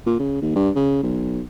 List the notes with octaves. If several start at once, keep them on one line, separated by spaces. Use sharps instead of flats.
A#2
C#3
D#2
G2
C#3
B1